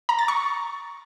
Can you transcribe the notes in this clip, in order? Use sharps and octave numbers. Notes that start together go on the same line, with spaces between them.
A#5
A6
C#6